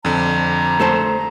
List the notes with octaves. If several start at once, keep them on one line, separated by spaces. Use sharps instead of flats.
F2 D3 A#5
A3 A4 C5